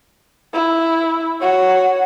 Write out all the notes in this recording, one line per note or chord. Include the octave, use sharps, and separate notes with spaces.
E4
F#4 C#5